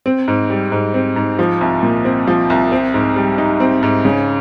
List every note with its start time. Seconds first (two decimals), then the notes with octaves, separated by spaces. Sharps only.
0.06 C4
0.28 G#2
0.50 G3
0.72 G#2
0.94 C4
1.16 G#2
1.39 F3
1.61 C2
1.83 A#2
2.05 C4
2.27 F3
2.50 C2
2.72 C4
2.94 G#2
3.16 G3
3.38 D#4
3.60 C4
3.83 G#2
4.05 C#3